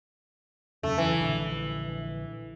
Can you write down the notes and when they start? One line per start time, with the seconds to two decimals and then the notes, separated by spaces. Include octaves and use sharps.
0.83 E1 F#2 C#3 A3
0.98 E3
1.19 A#1 D3